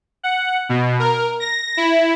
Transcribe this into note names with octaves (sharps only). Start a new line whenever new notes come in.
F#5
B2
A#4
A#6
E4